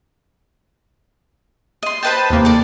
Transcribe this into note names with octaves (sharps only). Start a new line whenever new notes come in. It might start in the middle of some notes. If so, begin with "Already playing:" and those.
D#5 C6
B4 C5 D#5 G5 A5
D#2 C3 A#3
A4 D5